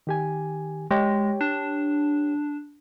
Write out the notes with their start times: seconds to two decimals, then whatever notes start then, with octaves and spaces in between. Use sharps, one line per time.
0.07 D#3 G4 G#5
0.91 G#3 G4 C#5 G5
1.41 D4